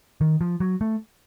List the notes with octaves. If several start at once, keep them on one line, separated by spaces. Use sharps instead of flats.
D#3
F3
F#3
A3